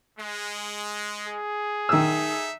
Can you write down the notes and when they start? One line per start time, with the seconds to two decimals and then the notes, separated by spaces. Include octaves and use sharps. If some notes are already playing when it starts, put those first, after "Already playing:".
0.18 G#3
1.28 G#4
1.89 D#3 D#4 A4 E5 E6